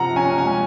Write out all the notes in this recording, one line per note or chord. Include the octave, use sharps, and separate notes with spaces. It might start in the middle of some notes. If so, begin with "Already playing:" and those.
Already playing: C3 F3 F#5 A#5
C#4 G#5
G#5
G#3